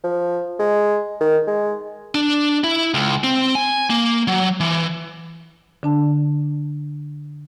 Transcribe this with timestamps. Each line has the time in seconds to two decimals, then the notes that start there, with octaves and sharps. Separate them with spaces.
0.04 F3
0.59 G#3
1.20 D#3
1.47 G#3
2.15 D4
2.64 E4
2.94 C#2
3.24 C4
3.55 G#5
3.90 A#3
4.28 F#3
4.60 E3
5.83 D3 D4 A5